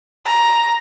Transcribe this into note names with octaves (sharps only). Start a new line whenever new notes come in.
A#5